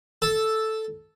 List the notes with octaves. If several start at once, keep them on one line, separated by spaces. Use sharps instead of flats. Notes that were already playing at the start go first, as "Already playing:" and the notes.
A4